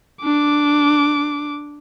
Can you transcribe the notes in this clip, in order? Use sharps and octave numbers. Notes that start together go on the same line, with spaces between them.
D4 D6